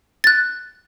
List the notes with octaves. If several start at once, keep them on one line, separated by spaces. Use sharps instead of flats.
F#6 A6